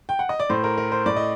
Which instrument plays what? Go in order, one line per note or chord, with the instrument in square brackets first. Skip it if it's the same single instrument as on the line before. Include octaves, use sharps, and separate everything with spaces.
[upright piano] G5
F#5
D#5
D5
A2 C5
A#4
A#4
C5
A2 D5
D#5